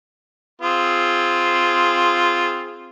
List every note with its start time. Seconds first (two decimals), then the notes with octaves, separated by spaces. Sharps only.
0.62 C4 F4 G#4